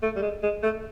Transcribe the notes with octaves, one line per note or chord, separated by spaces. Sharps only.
A3
G3
G#3
G#3
A3